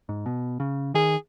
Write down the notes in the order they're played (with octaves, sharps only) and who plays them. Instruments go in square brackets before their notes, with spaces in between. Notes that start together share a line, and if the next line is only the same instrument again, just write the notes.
[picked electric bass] G#2
B2
C#3
[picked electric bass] D#3 [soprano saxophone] G#4